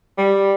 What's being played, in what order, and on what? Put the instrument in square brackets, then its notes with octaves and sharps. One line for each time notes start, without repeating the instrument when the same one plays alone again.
[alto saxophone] G3